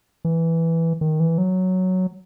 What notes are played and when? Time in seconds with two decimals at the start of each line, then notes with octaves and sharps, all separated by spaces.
0.25 E3
1.01 D#3
1.20 E3
1.38 F#3